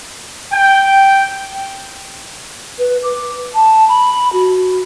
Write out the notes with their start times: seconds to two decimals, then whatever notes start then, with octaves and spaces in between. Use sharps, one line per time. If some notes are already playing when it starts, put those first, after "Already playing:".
0.53 G5
2.78 B4
3.03 D6
3.54 A5
3.88 B5
4.33 F#4